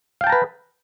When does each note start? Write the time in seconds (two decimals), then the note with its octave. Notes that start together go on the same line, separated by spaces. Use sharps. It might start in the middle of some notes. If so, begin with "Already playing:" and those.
0.21 F5
0.24 G5
0.27 A5
0.30 A#5
0.32 B4